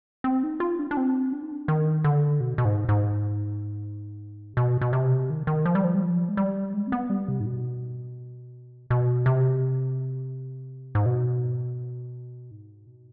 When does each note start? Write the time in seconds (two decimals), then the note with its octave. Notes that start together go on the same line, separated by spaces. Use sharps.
0.24 C4
0.43 D#4
0.60 F4
0.79 D4
0.91 D4
0.97 C4
1.33 D4
1.43 D#4
1.51 D4
1.68 D#3
2.04 D3
2.40 B2
2.58 B2
2.65 G#2
2.89 G#2
4.53 C3
4.57 B2
4.81 B2
4.93 C3
5.30 D#3
5.47 D#3
5.66 F3
5.75 G3
5.84 F3
5.95 G3
6.02 F3
6.29 G#3
6.37 G3
6.74 G#3
6.87 C4
6.92 B3
7.10 G3
7.28 C3
7.40 G#2
7.46 B2
8.90 B2
9.26 C3
10.95 G#2
11.06 B2
12.51 G#2
12.87 B2